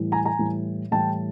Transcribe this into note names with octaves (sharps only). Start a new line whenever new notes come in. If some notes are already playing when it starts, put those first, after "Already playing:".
Already playing: A2 E3 G3
G#5 A#5
G#5 A#5
A2 E3 G3
A2 E3 G3 G5 A5